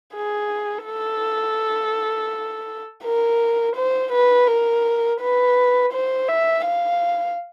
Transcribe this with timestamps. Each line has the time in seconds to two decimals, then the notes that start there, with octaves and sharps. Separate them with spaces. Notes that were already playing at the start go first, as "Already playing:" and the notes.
0.15 G#4
0.86 A4
3.04 A#4
3.76 C5
4.12 B4
4.48 A#4
5.21 B4
5.92 C5
6.28 E5
6.65 F5